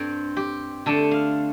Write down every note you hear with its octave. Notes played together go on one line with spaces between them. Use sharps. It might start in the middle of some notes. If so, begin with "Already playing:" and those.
Already playing: G2 G3 C4 C5
G4
D3 A3 D4 A4
F5